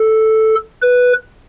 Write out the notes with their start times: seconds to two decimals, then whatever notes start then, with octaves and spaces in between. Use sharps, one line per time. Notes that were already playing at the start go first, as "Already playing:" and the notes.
Already playing: A4
0.82 B4